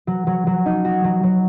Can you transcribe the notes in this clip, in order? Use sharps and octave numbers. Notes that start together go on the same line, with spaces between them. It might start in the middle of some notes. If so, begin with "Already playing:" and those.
F#3
F#3
F#3
D#4
F#4
F#3
F#3